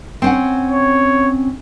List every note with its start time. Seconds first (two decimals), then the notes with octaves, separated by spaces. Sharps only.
0.22 C4 C#4 F#5
0.71 C#5